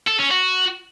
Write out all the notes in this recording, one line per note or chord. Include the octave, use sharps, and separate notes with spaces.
A4
C#4
F#4